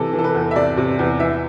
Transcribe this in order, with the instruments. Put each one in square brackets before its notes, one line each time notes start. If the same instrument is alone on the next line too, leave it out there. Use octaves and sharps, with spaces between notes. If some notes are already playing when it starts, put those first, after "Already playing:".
Already playing: [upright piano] C3 E3 A4
E3
A4
B4
E2
E5
C3 D5
C3
E2
E3 E5